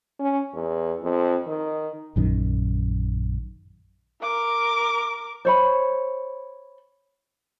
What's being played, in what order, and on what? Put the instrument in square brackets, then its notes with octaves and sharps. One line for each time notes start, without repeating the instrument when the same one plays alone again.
[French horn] C#4
E2
F2
D#3
[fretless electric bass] A#1 F#2 D#3
[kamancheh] A#4 D6
[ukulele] C5 C#5 B5